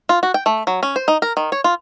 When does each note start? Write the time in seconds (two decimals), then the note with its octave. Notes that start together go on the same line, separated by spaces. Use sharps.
0.09 F4
0.23 F#4
0.34 G5
0.46 A3
0.67 F#3
0.83 C#4
0.96 C5
1.08 D#4
1.22 A#4
1.37 D#3
1.52 C#5
1.64 F4